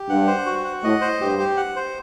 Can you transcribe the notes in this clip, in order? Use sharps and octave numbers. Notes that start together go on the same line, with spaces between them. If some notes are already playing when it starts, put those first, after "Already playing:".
Already playing: G4
G2 F#5
C5
F#4
F#5
A2 D#5
C5
G2 G4
G4
F#5
C5